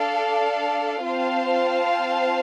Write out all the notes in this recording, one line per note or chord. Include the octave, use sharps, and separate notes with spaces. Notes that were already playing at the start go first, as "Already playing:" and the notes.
Already playing: D4 A4 D5 F5
C4 F4 C5 F5 A5